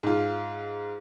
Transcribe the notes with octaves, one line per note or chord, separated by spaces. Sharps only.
G#2 F4